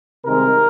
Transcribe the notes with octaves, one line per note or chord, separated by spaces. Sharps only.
C2 C3 D#3 G#3 A#4